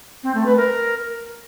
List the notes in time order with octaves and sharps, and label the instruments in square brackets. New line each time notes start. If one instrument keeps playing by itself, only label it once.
[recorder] C4
A3
B4
A#4